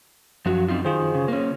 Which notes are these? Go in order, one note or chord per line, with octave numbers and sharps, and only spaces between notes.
F#2 F3 F#4
C4 D#4 F4
D#3 F4 G#4 C5
C#3
A#3 C#4